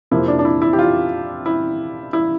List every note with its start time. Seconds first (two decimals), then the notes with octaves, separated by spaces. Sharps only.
0.11 F2 C3 F3 A#3 E4
0.28 D4
0.39 D4
0.45 E4
0.62 E4
0.73 G4
0.79 F4
1.46 E4
2.13 E4